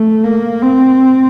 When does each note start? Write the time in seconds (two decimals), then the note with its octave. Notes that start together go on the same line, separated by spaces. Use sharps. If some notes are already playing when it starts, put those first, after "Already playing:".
Already playing: A3
0.24 A#3
0.62 C4